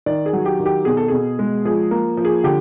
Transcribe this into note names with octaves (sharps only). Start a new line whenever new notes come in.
D#3 D5
G#4
F#3
G4
D#3
G4
B2 G#4
A4
B2 G#4
G#3
F3 G#4
A#3
F3
G#4
D3 G4